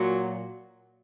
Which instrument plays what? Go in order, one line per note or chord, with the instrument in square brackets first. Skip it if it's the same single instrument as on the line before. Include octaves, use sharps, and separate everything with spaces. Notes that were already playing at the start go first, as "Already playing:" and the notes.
Already playing: [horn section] A#2 F#3